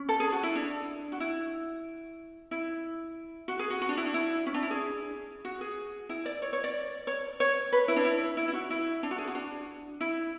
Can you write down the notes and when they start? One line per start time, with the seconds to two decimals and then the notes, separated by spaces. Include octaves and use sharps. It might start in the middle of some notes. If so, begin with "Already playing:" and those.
Already playing: C#4
0.09 A4
0.20 G#4
0.32 F#4
0.43 E4
0.56 D4
1.12 F#4
1.20 E4
2.51 E4
3.48 F#4
3.59 G#4
3.70 F#4
3.82 F#4
3.89 D4
3.97 E4
4.06 D4
4.14 E4
4.46 C#4
4.54 D4
4.62 E4
4.70 G#4
5.45 F#4
5.61 G#4
6.09 E4
6.26 D5
6.42 C#5
6.53 C#5
6.64 D5
7.07 C#5
7.40 C#5
7.72 B4
7.88 E4
7.96 D4
8.05 E4
8.37 E4
8.48 E4
8.53 F#4
8.70 E4
9.03 D4
9.11 F#4
9.18 G#4
9.27 F#4
9.35 D4
10.01 E4